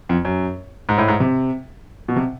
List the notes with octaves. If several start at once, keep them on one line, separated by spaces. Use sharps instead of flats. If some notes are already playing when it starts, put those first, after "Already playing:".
F2
F#2
G#2
A2
G#2
C3
B2
C3